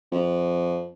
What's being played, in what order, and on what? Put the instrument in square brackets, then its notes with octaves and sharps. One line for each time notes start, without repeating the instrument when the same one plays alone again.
[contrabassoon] F2